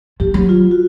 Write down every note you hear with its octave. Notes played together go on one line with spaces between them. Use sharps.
F3 G4
F#3
F4
F#4